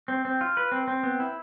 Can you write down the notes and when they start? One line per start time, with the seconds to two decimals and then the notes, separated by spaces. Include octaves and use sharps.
0.08 C4
0.25 C4
0.41 F4
0.57 B4
0.72 C4
0.87 C4
1.03 B3
1.20 E4